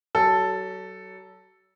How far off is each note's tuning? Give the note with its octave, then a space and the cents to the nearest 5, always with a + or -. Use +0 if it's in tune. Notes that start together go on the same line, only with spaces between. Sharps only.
F#3 +35 A4 +0